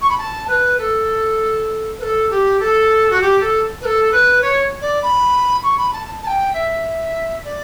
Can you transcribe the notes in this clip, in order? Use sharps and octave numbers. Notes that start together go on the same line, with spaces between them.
C#6
B5
A5
B4
A4
B4
A4
G4
A4
F#4
G4
A4
B4
A4
B4
C#5
D5
B5
C#6
B5
A5
A5
G5
E5
D5